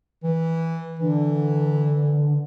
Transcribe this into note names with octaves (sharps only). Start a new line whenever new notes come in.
E3
D3 E3